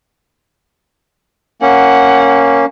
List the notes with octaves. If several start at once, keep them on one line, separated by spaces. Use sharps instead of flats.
A#3 C#4 F#5